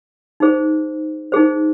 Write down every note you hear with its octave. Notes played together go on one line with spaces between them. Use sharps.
D#4 G#4 C5
D#4 G#4 C5